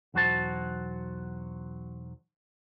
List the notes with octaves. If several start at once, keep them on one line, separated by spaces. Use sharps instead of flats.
B1 E2 F#3 F#4 C5 A5